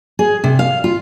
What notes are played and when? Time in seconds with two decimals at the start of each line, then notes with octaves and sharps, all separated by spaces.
0.19 G#4
0.44 C3
0.59 F5
0.84 F4